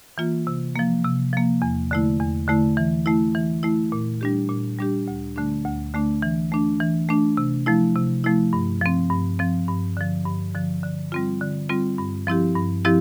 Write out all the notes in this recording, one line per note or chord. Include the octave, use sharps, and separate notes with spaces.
E3 A#3 F4
C3
F3 A#3
C3
F3 A#3
E2
D3 A3 E4
E2
D3 A3 E4
E3
A3 E4
E3
A3 E4
A#2
G3 D4 G4
A#2
G3 D4 G4
D2
D3 A3 D4
D2
D3 A3 D4
E3
A3 D4
E3
A3 D4
C3
F3 A3 E4
C3
F3 A3 E4
G2
F3 C4
G2
F3 C4
G2
D3 F3
G2
D3 F3
D3
G3 C4 F4
D3
G3 C4 F4
G2
F3 C4 E4 G4
G2
F3 C4 E4 G4